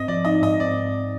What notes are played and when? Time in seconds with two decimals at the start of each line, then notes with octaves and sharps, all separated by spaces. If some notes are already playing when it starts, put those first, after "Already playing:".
Already playing: G#2 C4 D#5
0.08 F3 D5
0.25 D#4 D#5
0.42 G#2 D#5
0.60 C4 D5